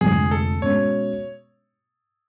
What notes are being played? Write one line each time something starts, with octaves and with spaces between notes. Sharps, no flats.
F1 F2 D3 G#3 G#4
A4
B2 G#3 C#4 C#5